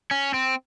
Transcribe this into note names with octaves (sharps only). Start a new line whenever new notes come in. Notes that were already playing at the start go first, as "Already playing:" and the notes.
C#4
C4